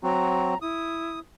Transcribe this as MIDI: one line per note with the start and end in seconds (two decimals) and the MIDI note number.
0.03 0.54 54
0.03 0.54 60
0.03 0.54 66
0.03 0.58 82
0.61 1.19 64
0.61 1.19 87